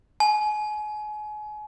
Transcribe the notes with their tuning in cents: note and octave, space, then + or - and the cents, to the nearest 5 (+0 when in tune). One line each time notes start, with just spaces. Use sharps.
G#5 +35